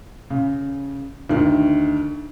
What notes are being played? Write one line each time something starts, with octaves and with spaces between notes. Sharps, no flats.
C#3
D2 D#3